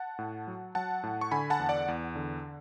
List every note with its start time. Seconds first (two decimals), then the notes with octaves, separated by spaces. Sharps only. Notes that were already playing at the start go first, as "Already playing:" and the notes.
Already playing: F#5 A5
0.19 A2
0.47 F#3
0.75 F#3 F#5 A5
1.03 A2
1.21 C#6
1.31 D3 G#5 B5
1.50 F#5 A5
1.59 E2
1.69 D5 F#5
1.88 E2
2.16 D3